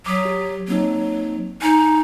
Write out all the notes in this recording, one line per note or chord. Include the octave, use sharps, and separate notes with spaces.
F#3 D6 D#6 B6
G4
F#3 A#3 C4 D#4
D#4 G#5